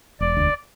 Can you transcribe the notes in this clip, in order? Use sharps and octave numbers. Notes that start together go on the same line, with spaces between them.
E1 D5
D2